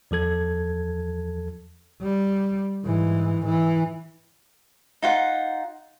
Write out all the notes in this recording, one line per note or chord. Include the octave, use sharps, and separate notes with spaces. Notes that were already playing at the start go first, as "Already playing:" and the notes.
E2 F3 A4 G#6
G3
G#2 E3
E3
D#4 F4 F#5